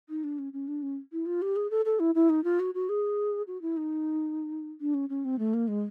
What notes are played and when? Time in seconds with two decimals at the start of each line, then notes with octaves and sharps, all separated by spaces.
0.09 D#4
0.24 D4
0.39 C#4
0.53 C#4
0.68 D4
0.83 C#4
1.12 E4
1.26 F4
1.42 G4
1.56 G#4
1.71 A4
1.85 A4
2.00 E4
2.15 E4
2.30 D#4
2.44 F4
2.60 F#4
2.74 F#4
2.89 G#4
3.47 F#4
3.62 E4
3.77 D#4
4.81 D4
4.94 C#4
5.09 C#4
5.25 C4
5.39 A3
5.54 A#3
5.68 G#3